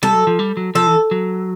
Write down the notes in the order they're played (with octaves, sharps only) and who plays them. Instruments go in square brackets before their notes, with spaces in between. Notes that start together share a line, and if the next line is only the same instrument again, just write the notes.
[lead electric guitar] G3 [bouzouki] A4
[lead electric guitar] F#3
F3
G3
F#3
[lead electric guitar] F3 [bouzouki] A4
[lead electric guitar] E3
F#3